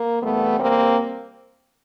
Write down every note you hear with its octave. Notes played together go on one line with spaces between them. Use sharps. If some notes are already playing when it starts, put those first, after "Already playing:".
Already playing: A#3
E2 C3 E3 G3 A3 B3
A#3 C4